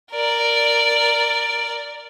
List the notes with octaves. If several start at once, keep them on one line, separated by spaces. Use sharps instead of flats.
A#4 D5